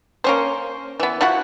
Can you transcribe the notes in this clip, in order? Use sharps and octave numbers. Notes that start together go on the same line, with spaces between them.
A#3 C#4 C5
E3 B3
F3 E4 F#4 F#5